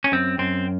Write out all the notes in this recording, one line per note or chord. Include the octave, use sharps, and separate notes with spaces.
C#4
F#2 C4
F#2 C4